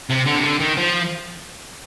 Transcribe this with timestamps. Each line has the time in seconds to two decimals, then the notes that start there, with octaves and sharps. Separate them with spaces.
0.10 C3
0.26 D3
0.35 C3
0.43 D3
0.60 D#3
0.77 F3